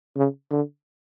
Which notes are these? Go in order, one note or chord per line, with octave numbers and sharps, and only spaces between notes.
C#3
D3